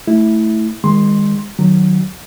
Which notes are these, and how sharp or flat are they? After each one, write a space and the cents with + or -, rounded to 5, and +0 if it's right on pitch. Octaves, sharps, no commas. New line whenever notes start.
A3 +0 E4 -10
D#3 +10 G#3 -35 C6 +10
D#3 -20 F#3 +0